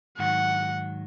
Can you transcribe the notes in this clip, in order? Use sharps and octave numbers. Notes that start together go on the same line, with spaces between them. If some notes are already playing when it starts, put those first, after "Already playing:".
G#2 D#3 F#3 F#5